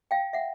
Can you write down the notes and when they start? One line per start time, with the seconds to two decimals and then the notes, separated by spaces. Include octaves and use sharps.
0.11 F5 G5
0.33 E5 F#5